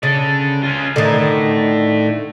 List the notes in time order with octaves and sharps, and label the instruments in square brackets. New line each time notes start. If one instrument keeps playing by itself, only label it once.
[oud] C#3 [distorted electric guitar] A4 D5
[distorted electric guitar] C#4 F4
[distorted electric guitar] A2 [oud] D3 D#3